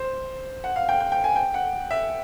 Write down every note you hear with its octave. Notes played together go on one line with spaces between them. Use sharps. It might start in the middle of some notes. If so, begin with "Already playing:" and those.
Already playing: C5
F#5
F5
G5
G5
G5
G#5
G5
F#5
E5